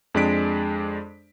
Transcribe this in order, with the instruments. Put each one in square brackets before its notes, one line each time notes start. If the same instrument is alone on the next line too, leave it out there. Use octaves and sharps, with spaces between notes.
[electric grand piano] F2 G#3 D4 D5 B6 D7